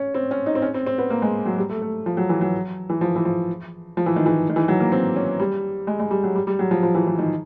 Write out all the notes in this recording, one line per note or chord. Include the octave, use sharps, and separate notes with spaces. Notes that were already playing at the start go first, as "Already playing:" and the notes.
Already playing: C#4
C4
C#4
D#4
C4
C#4
C4
C4
B3
A#3
G#3
F#3
G3
A3
A3
F3
F#3
E3
F#3
E3
F3
E3
F3
F3
E3
D#3
E3
D#3
E3
F#3
A#3
C4
C#4
G3
G#3
G#3
G3
F#3
G3
G3
F#3
F3
F3
E3
E3
D#3